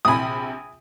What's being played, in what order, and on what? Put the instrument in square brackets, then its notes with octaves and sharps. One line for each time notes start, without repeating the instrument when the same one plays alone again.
[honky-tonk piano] A#1 C3 B5 [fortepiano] G#5 D#6